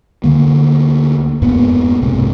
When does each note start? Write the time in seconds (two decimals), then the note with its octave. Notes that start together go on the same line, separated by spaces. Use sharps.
0.24 D2 D3 A#3
1.42 F2 G#2 A#3 B3
2.02 B1 G#2 C3